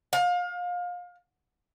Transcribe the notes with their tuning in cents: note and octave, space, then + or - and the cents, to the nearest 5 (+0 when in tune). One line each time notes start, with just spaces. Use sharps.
F5 +30